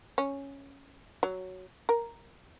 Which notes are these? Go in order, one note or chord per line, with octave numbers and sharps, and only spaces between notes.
C#4
F#3
A#4